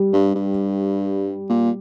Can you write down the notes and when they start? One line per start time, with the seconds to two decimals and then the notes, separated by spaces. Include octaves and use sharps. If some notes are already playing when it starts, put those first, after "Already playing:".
Already playing: G3
0.13 G2
0.35 G2
1.50 A#2